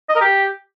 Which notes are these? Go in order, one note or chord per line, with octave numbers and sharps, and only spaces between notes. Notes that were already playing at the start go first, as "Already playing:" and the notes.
D#5
A#4
G4